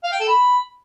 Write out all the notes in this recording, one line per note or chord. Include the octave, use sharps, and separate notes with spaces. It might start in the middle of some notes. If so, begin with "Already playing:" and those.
F5
G5
A4
B5